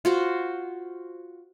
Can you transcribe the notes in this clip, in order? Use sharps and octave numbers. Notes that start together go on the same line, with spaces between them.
F4 F#4 C5